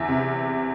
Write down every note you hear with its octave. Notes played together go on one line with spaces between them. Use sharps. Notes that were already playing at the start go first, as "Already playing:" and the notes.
Already playing: E2 E5
C3